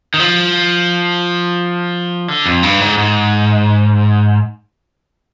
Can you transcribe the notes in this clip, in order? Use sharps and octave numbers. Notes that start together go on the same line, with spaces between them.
D#3
F3
D3
F2
G2
G#2
G#2